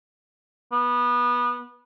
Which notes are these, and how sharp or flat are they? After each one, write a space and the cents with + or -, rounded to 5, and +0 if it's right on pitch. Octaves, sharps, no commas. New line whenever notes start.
B3 -20